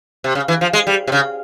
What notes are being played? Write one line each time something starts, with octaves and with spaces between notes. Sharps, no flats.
C3
C#3
E3
F3
G#3
G3
C3
C#3